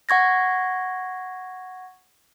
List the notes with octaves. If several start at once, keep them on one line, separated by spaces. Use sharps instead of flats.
F#5 C#6 G#6 A#6